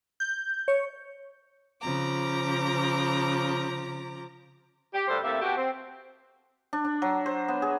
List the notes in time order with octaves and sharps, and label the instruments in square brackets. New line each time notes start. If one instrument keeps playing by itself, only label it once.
[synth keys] G6
C#5
[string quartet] C#3 F3 A#5 D6
[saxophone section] G4
D2 G2 G3 D4 A4 C5
C3 A3 A#3 E4 A4 E5
B2 F#4 G4
C4
[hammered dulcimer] D4
D4
F#3
C5
B3
G#4